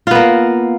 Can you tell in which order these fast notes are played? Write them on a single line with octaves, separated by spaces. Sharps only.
F4 B3 A#3